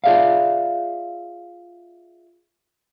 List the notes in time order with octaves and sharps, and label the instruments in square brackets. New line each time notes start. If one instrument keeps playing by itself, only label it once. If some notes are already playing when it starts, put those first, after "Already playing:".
[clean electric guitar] F4 G#4 D5 E5 F5